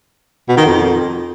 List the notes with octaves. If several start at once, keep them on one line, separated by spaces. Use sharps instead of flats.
B2
D#3
F2